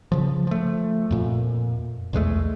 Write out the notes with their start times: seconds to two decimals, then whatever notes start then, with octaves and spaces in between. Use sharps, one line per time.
0.12 C#3 F3
0.47 F3 A3
1.11 F2 A#2
2.13 B1 E2 G#3 A3